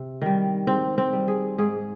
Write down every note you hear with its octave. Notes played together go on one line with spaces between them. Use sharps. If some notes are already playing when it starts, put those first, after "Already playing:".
Already playing: C3
D#3 G3
G#2 C4
C4
G3
G#4
G#2 G#4